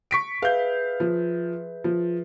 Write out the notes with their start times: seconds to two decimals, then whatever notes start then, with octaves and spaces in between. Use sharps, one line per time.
0.11 C#6 B6 D7
0.42 G#4 B4 E5 F5 G6
1.00 F3
1.84 F3